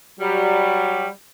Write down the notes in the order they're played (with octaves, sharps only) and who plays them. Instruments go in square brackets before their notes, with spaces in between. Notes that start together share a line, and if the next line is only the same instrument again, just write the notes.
[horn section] F#3 G3